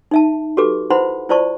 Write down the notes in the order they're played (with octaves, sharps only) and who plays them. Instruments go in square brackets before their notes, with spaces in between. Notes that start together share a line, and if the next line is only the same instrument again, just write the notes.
[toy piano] D#4 E5 A5
F#4 G4 A4 B4 D6
E4 B4 C5 F#5 B5 C6
E4 F4 C5 D5 A5 C#6